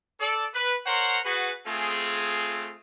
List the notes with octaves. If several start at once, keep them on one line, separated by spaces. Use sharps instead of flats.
A4 D5
B4
A#4 C5 C#5 F#5 A#5 C6
F#4 G#4 B4
A3 C4 F4 G#4